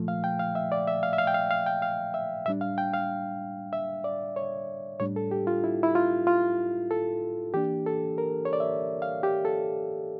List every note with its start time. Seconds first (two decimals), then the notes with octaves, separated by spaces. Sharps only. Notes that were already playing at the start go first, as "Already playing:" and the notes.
Already playing: A#2 F3 A3
0.08 F5
0.24 G5
0.39 F5
0.55 E5
0.72 D5
0.88 E5
1.03 F5
1.13 E5
1.18 F5
1.27 G5
1.34 F5
1.51 F5
1.66 G5
1.82 F5
2.14 E5
2.46 A2 G3 D4 E5
2.61 F5
2.78 G5
2.94 F5
3.73 E5
4.04 D5
4.36 C#5
5.00 A2 G3 D4 C#5
5.16 A4
5.31 G4
5.47 F4
5.64 E4
5.83 E4
5.95 F4
6.27 F4
6.91 A4
7.54 E3 A#3 D4 G4
7.86 A4
8.18 A#4
8.45 C#5
8.53 D5
8.60 E5
9.02 F5
9.23 G4
9.45 A4